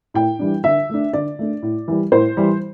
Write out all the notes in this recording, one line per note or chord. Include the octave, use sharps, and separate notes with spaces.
A2 G5
E3 G3 D4
D3 E5
A3 D4
D3 D5
A3 D4
A2
E3 G3
A2 C5
E3 G3